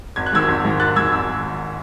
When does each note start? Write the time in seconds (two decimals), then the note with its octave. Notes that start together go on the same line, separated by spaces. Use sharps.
0.16 G#1 G#6
0.26 F#6
0.33 G#2 D#3 E6 G#6
0.49 G#1
0.65 G#2 D#3
0.80 G#1 F#6 A6
0.96 G#2 D#3 E6 G#6
1.12 G#1 E6